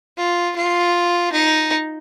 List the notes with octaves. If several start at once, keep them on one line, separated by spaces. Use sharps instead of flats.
F4
F4
D#4